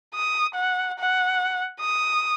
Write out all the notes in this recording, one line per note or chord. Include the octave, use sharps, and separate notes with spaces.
D#6
F#5
F#5
D#6